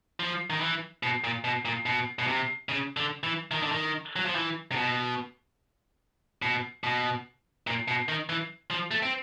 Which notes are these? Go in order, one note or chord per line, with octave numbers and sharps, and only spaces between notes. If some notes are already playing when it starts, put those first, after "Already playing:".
F3
D#3
E3
B2
A#2
B2
A#2
B2
B2
C3
C#3
D3
E3
D#3
D3
D#3
F#3
F3
E3
C3
B2
B2
B2
A#2
B2
D#3
E3
F3
A3
C4